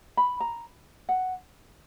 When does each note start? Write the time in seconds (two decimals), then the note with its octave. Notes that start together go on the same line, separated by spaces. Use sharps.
0.17 B5
0.40 A#5
1.09 F#5